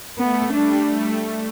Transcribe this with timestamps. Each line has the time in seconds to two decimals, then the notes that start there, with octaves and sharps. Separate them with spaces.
0.18 A3 B3
0.53 G3 D4
0.87 A3